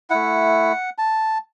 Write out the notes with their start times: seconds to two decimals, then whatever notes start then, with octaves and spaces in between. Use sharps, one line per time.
0.10 A3 E4 F#5
0.98 A5